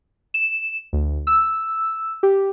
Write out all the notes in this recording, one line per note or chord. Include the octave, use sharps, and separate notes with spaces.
E7
D2
E6
G4